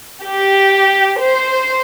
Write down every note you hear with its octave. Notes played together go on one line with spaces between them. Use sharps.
G4
C5